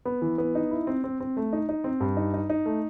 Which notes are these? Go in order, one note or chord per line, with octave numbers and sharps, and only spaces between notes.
B3
E3
B3
D#4
E4
C4
C4
C4
A3
D#4
D#4
C4
G2
D#4
D#4
D#4
A3